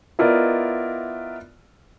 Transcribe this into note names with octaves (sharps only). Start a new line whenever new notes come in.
B3 E4 F4 A#4 D5 D#5